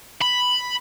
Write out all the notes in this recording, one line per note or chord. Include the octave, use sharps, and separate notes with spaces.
B5